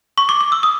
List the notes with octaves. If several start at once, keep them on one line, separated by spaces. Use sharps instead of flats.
C#6
D6
D6
E6
D#6